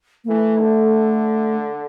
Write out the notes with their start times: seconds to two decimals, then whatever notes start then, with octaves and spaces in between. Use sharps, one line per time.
0.24 A#3
0.28 E3 A3
0.60 D3